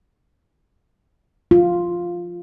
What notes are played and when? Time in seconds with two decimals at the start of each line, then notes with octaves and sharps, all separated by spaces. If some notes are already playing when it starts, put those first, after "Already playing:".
1.51 F4